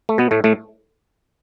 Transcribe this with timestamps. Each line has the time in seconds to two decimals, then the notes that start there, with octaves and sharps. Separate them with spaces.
0.09 A3
0.18 B2 B3
0.31 A2 A3
0.44 A2 A3